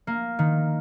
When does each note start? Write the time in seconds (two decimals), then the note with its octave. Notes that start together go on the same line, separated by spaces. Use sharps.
0.07 A#3
0.39 D#3